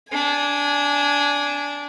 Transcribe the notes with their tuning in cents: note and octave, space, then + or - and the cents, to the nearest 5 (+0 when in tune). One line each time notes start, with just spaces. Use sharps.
D4 -20 G#5 +0